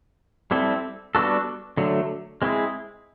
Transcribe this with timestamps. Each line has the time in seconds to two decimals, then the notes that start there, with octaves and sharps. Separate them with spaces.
0.51 G3 C4 E4 A4
1.15 G3 B3 D4 F#4 A4
1.77 D3 F#3 A3
2.42 G#3 C4 E4 G#4